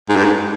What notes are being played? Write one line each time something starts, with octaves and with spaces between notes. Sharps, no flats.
G#2
G2
G#2